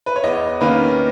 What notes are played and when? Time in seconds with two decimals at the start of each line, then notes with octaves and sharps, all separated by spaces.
0.06 B4
0.16 C#5
0.23 E2 D#5
0.61 D#3 A#3 C#4 B4